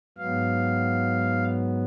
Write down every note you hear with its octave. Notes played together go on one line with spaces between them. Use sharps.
G#2 F#3 B3 F5